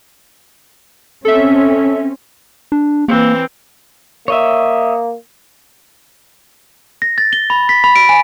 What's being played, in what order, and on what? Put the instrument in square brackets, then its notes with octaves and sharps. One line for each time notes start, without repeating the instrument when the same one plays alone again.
[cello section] C4 C#4 [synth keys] A4 E5
[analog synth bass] D4
[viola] E3 C4 [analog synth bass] A#3
[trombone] A#3 [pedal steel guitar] C#5 D#5 E5
[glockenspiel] A#6
A6
G7
B5
B6
B5
D7
G#5